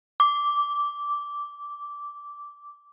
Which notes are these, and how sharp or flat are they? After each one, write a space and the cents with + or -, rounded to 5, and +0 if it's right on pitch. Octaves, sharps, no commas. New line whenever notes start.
D6 -10